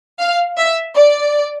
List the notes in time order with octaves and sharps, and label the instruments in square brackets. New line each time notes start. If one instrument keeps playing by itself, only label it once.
[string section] F5
E5
D5